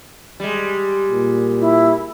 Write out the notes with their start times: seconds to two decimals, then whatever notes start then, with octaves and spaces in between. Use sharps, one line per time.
0.40 G3 G#3
1.11 A#2
1.59 E4